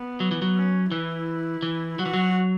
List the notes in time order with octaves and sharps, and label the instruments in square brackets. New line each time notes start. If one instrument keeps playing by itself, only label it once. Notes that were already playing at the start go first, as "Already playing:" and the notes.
Already playing: [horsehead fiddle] B3
[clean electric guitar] F#3
E3
F#3
[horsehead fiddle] C#4
[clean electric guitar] E3 [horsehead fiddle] E4
[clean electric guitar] E3
[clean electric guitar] F#3 [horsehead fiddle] F#4
[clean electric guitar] E3
F#3